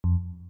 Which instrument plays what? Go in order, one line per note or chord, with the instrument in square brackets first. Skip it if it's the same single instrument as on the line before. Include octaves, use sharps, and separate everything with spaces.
[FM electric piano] F2